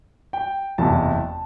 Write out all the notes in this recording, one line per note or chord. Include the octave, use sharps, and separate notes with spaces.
G5
F#1 E2 C3 A5